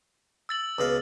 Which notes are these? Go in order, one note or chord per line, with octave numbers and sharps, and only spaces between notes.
E6 A6 F#7
C#2 B2 F5